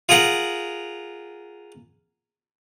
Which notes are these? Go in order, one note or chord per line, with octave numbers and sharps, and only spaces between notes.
F4 G#4 A#4 F#5